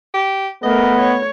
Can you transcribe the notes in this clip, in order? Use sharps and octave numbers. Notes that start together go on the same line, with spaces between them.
G4
A3 B3 A#4 D#5
C#5